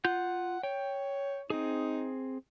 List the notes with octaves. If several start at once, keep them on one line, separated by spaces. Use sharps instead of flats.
F4 F#5 G6
C#5 G5
C4 D#4 G#4